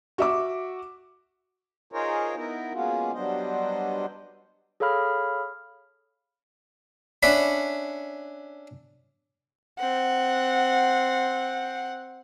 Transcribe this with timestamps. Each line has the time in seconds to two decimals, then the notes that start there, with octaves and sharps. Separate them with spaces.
0.18 F#4 E5 D6
1.92 D#4 F4 G#4 A#4 C5 C#5
2.36 B3 D#4 E4 A#4
2.73 G#3 A#3 B3 C#4 F4 F#4
3.14 F#3 G3 B3 D4 C5 D#5
4.80 G#4 A4 C#5 F5 B5 F6
7.23 C#4 D4 E5 F#5 B5
9.79 C4 F#5